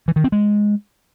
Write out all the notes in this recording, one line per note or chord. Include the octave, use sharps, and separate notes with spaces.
E3
D#3
C4
G#3